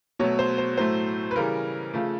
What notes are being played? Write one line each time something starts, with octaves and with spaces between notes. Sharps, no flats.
B2 F#3 A3 C#5
C5
C5
A2 F#3 A3 C5
B4
C#3 E3 G3 A#4
C#3 F3 A3